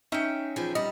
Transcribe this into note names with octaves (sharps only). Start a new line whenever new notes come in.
C#4 D#4 E5 G5
E2 F3 G#4
G3 D#5